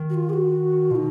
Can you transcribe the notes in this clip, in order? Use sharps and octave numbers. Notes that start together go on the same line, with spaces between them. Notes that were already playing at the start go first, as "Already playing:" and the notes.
Already playing: D#3
F#4
F4
G#4
F#4
B2 D#4 F4